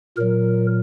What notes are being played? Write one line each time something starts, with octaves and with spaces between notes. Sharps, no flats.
A#2 F#3 A#4